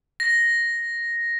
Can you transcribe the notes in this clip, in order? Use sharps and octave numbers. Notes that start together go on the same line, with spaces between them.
A#6